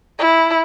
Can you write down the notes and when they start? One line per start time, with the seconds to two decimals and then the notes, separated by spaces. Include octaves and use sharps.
0.19 E4